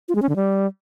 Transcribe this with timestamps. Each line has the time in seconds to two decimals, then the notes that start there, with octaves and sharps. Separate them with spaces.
0.08 F4
0.15 G#3
0.22 C#4
0.29 D3
0.36 G3